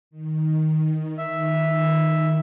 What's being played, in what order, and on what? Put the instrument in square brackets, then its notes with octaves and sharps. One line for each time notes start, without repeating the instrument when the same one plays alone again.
[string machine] D#3
[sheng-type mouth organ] E5